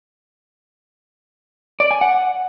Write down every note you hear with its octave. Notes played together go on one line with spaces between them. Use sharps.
D5
G#5
F#5